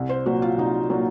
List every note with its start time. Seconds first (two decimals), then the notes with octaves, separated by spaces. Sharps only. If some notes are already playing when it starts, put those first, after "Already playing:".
Already playing: C2
0.09 C5
0.25 A#2 F#3 F#4
0.42 F4
0.58 C2 D#4
0.90 A#2 F#3